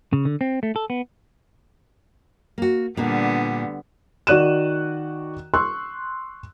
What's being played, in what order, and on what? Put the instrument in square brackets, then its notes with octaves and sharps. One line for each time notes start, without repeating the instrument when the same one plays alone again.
[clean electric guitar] C#3
D3
C4
A3
A4
B3
[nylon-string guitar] A#3 F#4
[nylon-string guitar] A#2 A#3 D4 [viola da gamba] D3 G3 B3
[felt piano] D#3 F#4 D5 F#6 D#7 E7
C6 C#6 E6 F#6